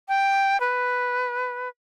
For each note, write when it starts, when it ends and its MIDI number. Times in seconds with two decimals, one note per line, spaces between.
0.08 0.60 79
0.60 1.68 71